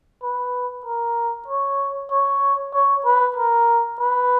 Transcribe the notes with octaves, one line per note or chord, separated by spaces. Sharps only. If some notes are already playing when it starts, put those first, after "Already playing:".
B4
A#4
C#5
C#5
C#5
B4
A#4
B4